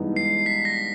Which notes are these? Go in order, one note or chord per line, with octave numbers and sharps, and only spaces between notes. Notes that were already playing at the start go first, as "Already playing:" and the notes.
Already playing: G2 E3 G#3 B3 D#4
C7
B6
A#6